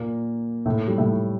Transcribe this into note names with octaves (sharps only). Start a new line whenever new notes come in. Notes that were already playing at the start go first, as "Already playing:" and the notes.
Already playing: A#2 A#3
A2 A3
G3
A2 A3